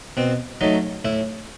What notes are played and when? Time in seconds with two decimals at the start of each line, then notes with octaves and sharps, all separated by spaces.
0.17 B2 C4
0.61 F#3 A3 D#4
1.05 A2 E4